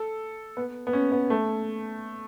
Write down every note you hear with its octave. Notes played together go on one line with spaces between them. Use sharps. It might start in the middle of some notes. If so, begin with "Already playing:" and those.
Already playing: A4
B3
B3
C#4
B3
A3